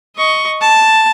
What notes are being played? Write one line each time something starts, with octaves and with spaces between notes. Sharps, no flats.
D#5 C#6
A5